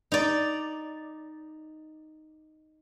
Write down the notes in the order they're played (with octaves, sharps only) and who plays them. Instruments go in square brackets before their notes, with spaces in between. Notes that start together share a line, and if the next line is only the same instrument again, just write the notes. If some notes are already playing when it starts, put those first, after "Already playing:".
[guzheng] D#4 D5